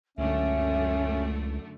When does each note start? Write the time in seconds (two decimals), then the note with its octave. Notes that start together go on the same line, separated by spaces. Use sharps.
0.18 C#2 F#2 D3 A3 C#4 E5